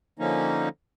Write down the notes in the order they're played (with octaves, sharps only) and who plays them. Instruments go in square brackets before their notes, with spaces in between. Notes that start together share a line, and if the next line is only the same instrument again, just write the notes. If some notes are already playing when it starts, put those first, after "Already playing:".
[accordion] D3 F3 A#3 C#4 D#4